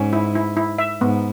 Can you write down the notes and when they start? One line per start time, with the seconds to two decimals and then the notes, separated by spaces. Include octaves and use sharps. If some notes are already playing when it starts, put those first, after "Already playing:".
Already playing: G#2 C#4
0.13 E4
0.35 E4
0.57 E4
0.78 E5
1.01 G#2 B3